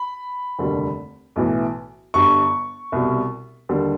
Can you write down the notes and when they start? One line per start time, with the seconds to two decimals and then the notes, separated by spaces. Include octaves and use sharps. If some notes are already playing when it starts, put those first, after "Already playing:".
Already playing: B5
0.59 F1 D#2 D3 G3
1.36 B1 A2 E3
2.14 G1 G2 D3 G3 C#6
2.92 C2 B2 G3
3.69 D#2 D3 G3